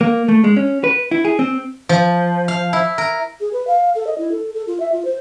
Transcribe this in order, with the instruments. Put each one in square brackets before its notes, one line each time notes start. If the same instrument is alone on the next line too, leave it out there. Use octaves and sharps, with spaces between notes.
[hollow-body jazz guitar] A#3
A3
G#3
C#4
B4
E4
G#4
C4
[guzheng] F3
F5
E4
A#4
[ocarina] G#4
B4
F5
A4
D#5
E4
A4
A4
F4
E5
F4
C5